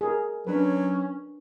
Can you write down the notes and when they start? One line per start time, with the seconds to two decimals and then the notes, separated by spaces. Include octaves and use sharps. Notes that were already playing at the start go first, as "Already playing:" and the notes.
0.01 G#4 A#4
0.47 F#3 C#4 D4 B4